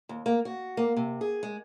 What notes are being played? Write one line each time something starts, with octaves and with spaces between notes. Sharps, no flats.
D#2
A#3
F#4
A#3
C3
G#4
G#3